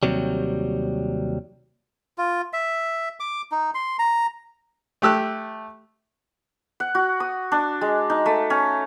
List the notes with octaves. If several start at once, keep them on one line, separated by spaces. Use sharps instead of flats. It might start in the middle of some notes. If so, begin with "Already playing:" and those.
D#2 C3 F#3 G3
F4
E5
D6
D#4
C6
A#5
A3 G4 E6 F#6
F#5
F#4
D#6
D4
G#3
D#4
A3
C#4